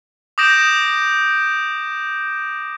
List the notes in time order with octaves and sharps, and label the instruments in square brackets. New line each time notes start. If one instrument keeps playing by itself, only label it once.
[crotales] D6 D#6 G6 A#6 D7 E7